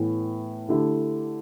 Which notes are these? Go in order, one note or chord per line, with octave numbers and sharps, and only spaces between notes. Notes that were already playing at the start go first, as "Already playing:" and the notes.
Already playing: A2 E3 B3
D3 A3 E4 G4